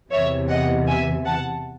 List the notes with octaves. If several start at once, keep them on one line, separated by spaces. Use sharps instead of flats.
E2 C3 E3 C#5 E5
D#5 F#5
E5 G#5
F#5 A5